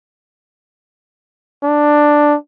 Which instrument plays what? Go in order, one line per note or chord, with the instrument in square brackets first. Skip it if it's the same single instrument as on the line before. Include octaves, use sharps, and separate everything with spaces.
[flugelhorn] D4